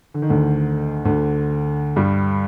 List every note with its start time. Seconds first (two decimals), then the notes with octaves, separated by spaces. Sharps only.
0.14 D3
0.22 D#3
0.29 D2 D3
1.05 D2 D3
1.96 G2 G3